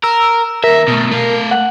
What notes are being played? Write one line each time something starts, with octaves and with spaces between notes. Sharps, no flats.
A#4 E6
D#2 A#4 E5
B2 A3
A3 F5
F#5